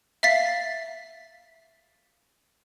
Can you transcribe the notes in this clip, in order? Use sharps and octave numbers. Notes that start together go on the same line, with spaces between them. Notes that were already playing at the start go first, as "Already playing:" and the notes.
E5 F5 A6 B6 C7